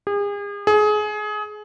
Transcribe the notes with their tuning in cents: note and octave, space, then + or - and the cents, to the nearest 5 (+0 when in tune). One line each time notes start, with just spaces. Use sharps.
G#4 -40
G#4 +25